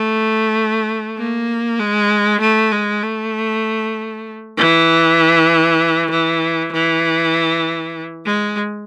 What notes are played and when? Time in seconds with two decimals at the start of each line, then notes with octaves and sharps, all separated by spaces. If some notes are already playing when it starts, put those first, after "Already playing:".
Already playing: A3
1.18 A#3
1.79 G#3
2.40 A3
2.72 G#3
3.02 A3
4.57 E3
6.11 E3
6.72 E3
8.25 G#3